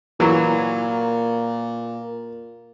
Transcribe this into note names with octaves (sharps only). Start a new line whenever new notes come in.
A#2 E3 F#3